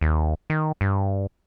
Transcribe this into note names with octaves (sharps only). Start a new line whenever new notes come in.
D#2
D#3
G2